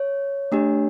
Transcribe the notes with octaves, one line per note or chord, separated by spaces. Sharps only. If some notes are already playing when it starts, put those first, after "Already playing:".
Already playing: C#5
A3 D4 G4